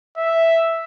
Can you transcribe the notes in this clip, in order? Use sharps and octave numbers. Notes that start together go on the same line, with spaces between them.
E5